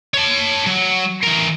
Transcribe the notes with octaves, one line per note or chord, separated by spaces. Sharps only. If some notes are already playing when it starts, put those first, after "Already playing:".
C#5 A5
F#3
E3 A#4